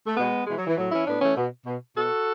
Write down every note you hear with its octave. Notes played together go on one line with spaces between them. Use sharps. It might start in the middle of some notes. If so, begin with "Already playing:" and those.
A3
B2 G#3 B3
B2 E3 G#3
F#3
E3
A2 F#3
E3 C#4 E4
A2 B3 D4
E3 A3 C#4
B2
B2
B2 F#4 A4